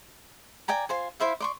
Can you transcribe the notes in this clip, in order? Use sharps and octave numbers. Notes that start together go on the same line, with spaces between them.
D5 G5 G#5 A#5
F4 C5 G#5
E4 C5 E5 F5
D5 C6 C#6